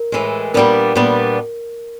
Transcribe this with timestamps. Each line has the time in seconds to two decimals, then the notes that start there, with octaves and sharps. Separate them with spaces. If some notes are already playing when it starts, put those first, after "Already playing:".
Already playing: A#4
0.12 A2 E3 G#3
0.54 A#2 G3 B3 D4 A#4
0.95 A#2 G3 B3 D4